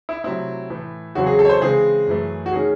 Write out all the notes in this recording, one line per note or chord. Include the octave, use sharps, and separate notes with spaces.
E4
C3 F#3 A3 C4 E4
A2 E3 A3
E2 C#3 F#3 C4 F#4
G#4
A4
C#5
C5
C#3 E3 G#3 C4 G#4
F#2 E3 A3
F#4
D#3 A3 C#4 G#4